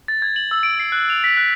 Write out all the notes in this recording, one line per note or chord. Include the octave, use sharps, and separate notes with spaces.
A6
G#6
F#7
E6
D7
C7
F#6
F7
B6
F#6